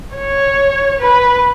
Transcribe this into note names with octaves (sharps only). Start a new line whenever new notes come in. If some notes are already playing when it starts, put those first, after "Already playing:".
C#5
B4